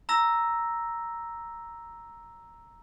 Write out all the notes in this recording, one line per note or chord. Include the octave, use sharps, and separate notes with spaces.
A#5 E6 A#6